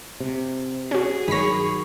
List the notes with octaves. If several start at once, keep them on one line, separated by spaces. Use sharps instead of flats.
C3
C#4 F#4 G#4
G1 D#3 F#3 C#5 B5 A#6